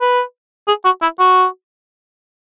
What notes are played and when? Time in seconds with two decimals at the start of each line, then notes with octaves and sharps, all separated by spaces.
0.01 B4
0.68 G#4
0.85 F#4
1.02 E4
1.19 F#4